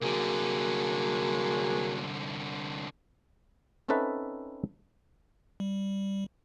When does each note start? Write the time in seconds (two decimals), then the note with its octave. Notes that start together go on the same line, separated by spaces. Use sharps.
0.02 C2 D3 F#3 A#3 G#4
3.88 C4 C#4 D#4 A4 B4 E5
5.60 G3